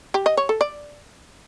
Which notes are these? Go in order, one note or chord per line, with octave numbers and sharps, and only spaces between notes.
G4
D#5
C#5
A4
D5